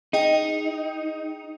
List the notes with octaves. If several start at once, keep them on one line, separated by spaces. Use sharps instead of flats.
D#4 G#4 D#5 G5